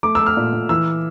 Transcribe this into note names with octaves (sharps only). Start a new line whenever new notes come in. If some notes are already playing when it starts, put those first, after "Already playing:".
A3 D6
A3 E6
F6
A#2
A#2
E3 E6